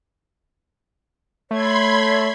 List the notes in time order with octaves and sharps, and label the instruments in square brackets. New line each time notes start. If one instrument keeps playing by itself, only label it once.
[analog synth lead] A3 [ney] C#5 [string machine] B5 C6 G#6